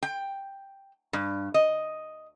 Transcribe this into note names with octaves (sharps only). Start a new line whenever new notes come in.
G5
G2
D#5